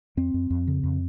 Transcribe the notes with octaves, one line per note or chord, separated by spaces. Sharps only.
F2 C4
F2
F2
C#3
F2